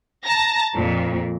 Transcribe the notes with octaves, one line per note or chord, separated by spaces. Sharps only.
A5 A#5 A#6
F2 A#2